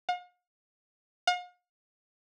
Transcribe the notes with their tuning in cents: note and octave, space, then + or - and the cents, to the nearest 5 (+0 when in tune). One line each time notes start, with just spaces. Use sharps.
F5 +45
F5 +45